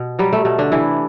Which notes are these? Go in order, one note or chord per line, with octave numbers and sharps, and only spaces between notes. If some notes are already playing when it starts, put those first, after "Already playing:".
Already playing: B2
F#3 G3
A3
B2 A3
D3 D4
C3 E3 E4